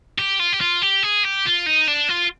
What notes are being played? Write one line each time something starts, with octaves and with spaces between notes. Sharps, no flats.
G4
F4
G4
F4
G4
G#4
G4
F4
D#4
D4
F4